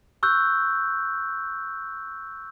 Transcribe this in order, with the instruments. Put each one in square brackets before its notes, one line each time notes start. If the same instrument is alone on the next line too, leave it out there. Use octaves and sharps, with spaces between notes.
[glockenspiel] C#6 E6 F#6 G6